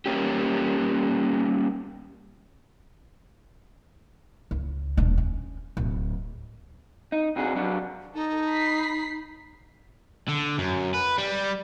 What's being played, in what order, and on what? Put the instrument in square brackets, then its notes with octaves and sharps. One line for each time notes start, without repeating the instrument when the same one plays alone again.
[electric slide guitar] G3 A#3 C#4 G4
[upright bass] C#2
D#1 D4
C#4
D1
[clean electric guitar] D#4
C3 D4 F#4 G#4
F#3 D4
[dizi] D#4 [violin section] A4
[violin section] B5 B6 C7
[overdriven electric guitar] D3
F#2
B4
G3